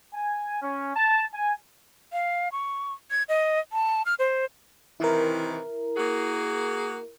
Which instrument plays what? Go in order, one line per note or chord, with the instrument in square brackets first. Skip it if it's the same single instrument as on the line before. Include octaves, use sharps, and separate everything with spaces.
[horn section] G#5
C#4
A5
G#5
[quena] F5
C#6
G#6
D#5
A5
F6
C5
[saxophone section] C3 D#3 E3 [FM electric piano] E4 A#4
[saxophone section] A#3 F#4 G#4